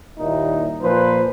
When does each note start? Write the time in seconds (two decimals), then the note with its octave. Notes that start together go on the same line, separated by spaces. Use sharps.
0.18 D#2 A#2 G3 D#4 E4
0.81 A#2 F3 B4 C5